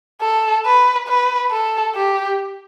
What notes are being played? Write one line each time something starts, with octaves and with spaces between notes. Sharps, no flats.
A4
B4
B4
A4
G4